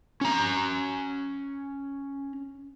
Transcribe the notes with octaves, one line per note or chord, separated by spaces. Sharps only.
C#4 A#5